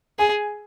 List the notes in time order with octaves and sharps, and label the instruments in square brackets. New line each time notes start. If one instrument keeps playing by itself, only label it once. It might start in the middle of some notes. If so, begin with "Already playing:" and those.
[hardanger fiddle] G#4 [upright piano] G#5